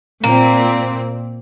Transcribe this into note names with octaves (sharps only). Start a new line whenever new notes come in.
A#2 A#3 C4